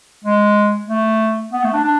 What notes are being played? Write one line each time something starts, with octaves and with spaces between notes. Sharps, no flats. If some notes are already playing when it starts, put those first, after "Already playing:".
G#3
A3
B3
A3
D4
D4